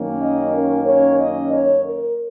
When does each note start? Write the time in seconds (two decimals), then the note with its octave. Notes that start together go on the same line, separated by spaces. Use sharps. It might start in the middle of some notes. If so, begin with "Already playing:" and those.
Already playing: F#2 D#3 A#3 C#4
0.20 D#5
0.53 A#4
0.85 C#5
1.19 D#5
1.51 C#5
1.84 A#4